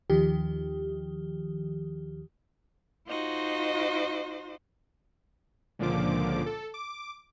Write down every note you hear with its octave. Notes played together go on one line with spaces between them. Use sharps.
D#2 D#3 F3 G4
D#4 F4 F#4 C5 D#5
C#2 A#2 D3 F3 D6
A4
D6